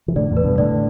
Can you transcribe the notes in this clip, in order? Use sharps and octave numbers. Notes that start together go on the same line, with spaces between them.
E3
A2 D3 D5
E2 A2
B4
G2 B2
A2 D3 D5